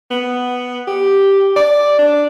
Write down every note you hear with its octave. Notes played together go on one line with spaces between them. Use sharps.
B3
G4
D5
D4